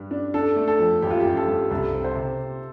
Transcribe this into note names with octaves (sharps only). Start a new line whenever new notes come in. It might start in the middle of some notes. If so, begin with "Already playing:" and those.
Already playing: G2
D4
D4 A4
A3
A4
F2
A1 G4
F4
A1 G4
A4
G2
C2 A4
C4
C5
C3